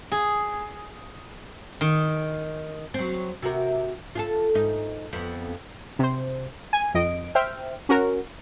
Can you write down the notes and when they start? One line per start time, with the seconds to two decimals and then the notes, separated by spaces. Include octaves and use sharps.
0.12 G#4
1.81 D#3
2.94 F#3 C4
3.42 C3 F#4 A#4
4.15 F4 G#4 A4
4.54 G#2 D#4
5.13 F2 B3
5.99 C3 C5
6.73 G#5
6.95 F2 D#5 D7
7.35 C5 E5 G5 F6
7.89 C#4 F#4 A#4